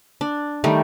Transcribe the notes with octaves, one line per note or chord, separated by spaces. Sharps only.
D4
D#3 G3 A3